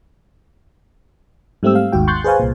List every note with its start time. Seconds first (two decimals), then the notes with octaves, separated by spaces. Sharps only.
1.63 G#2 G3 A3 C4 G4 E6
1.75 F5
1.92 G#1 D#2 G#2 F#4 G5
2.07 C6 C#6 F#6 G6 A6 C7
2.24 G#4 B4 C5 F5 G#5
2.39 C2 A#2